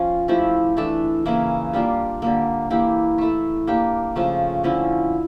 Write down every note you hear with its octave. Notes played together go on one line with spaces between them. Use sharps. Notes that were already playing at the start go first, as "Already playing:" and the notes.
Already playing: F3 C#4 F4
F3 A3 E4 G4
E3 A3 D4 A4
C#3 E3 A#3 E4
G3 A#3 D4 F4
D3 G3 A#3
E3 A#3 E4 G4
A3 E4 A4
A#3 D4 G4
C#3 F3 A3
D3 F3 C#4 E4